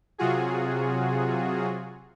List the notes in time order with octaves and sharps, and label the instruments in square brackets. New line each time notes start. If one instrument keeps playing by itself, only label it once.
[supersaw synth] C3 F#3 F4 F#4 G#4